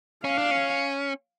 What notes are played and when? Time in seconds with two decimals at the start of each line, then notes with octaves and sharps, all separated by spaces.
0.25 C#4 F5
0.38 D4
0.51 C#4